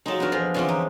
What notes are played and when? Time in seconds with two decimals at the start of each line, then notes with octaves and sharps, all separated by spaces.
0.06 F3 F#3 G#3 D#4 A4
0.20 B3 D4 D#4 F#4 A#4
0.32 F2 F3 G#3
0.54 D3 E3 F3 G#3 C4 C#4 G4
0.68 D#4